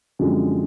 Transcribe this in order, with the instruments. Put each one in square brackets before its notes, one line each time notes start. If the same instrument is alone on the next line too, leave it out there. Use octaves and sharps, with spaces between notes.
[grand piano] F#2 D3 F3 G#3 C4